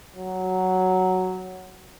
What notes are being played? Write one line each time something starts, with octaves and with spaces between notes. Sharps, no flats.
F#3